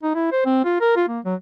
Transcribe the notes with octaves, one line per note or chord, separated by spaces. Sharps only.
D#4
E4
C5
C4
F4
A#4
F4
A#3
F#3